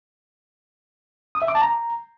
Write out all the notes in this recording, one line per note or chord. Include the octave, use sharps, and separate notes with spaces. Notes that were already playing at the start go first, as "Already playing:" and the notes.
D#6
E5
D6
A5
A#5